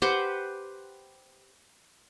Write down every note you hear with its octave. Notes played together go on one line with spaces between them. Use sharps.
G4 B4 C5 F#5